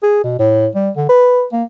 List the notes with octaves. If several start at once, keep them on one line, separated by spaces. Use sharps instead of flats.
G#4
B2
A2
G3
D3
B4
A#3